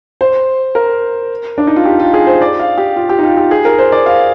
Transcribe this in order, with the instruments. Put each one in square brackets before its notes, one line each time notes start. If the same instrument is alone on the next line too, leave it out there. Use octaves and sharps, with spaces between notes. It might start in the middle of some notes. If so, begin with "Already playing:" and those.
[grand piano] C5
A#4
D4
D#4
F4
G4
F4
G#4
C5
D5
F5
G4
F4
G4
D#4
F4
G4
G#4
A#4
C5
D5
F5